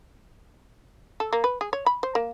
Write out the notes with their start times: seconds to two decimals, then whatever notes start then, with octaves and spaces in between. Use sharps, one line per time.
1.20 A4
1.33 A#3
1.44 B4
1.61 G#4
1.73 C#5
1.86 B5
2.03 C5
2.15 A#3